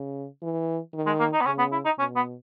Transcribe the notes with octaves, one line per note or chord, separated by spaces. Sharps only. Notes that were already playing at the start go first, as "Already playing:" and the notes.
Already playing: C#3
E3
D#3
G#3
A#3
D#4
B3
C#3 C#4
B3
E4
D#4
B2 C#4
B3